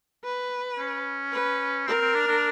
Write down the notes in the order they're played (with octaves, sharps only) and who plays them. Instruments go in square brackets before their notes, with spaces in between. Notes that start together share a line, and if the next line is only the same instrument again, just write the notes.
[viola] B4
[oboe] C#4
[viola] B4
[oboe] C4 [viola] A#4
[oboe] C4
D4
D4